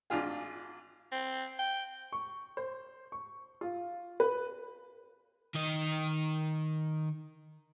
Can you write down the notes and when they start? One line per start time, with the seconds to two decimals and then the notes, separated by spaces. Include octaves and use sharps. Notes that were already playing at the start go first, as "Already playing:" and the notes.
0.10 G#1 D4 F4 G#4
1.12 C4
1.59 G5
2.12 C#6
2.57 C5
3.12 C#6
3.61 F4
4.20 B4
5.55 D#3 D#5